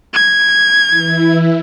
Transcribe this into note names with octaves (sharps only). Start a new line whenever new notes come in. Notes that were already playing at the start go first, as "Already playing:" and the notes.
G#6
E3 E4